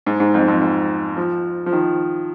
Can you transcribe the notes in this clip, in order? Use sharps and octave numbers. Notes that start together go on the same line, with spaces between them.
G#2
G#2
F2
F2
G#2
F3
F3
D#3